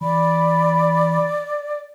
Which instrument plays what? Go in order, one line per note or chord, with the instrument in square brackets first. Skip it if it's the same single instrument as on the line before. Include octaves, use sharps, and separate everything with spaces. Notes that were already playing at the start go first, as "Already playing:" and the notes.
[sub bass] E3 [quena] D5 [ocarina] B5